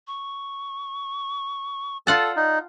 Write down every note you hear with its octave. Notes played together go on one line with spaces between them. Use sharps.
C#6
F4 A4 D5 F#5 A5
D#4 D5